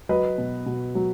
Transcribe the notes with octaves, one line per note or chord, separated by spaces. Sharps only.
F#3 B4 D#5
B2
B2
F#3